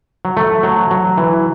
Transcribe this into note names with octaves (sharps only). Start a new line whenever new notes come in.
F#3
A3
F#3
F#3
E3